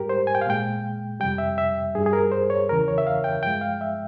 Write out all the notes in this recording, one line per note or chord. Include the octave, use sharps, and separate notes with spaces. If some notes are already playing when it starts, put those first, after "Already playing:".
Already playing: G#2 G3 G4 A#4
C5
G#5
G5
F5
A#2 G#3 G5
F2 C3 G3 G5
E5
E5
G2 G3 G#4
G#4
A#4
C5
C#5
E2 C#3 E3 A#4
C#5
E5
F5
G5
G2 F3 G#3 G5
F5
E5